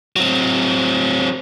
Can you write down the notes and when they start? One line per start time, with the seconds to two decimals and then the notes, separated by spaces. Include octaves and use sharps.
0.16 F#3 C4